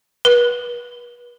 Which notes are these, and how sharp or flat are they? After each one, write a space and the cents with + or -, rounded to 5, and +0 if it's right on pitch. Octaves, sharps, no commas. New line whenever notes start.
B4 -35